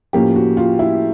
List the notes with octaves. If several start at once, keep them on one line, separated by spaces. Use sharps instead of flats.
A2 F3 A#3 C#4 G4
F#4
F4
E4